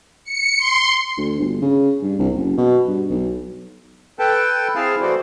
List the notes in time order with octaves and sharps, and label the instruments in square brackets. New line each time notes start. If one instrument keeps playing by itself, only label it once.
[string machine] C#7
C6
[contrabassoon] D2
G1
C#3
G2
C2
F#1
B2
G2
B1
[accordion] A4 B4 G5 A5
C4 E4 G#4 F5 A5
E3 A3 F#4 C5 D5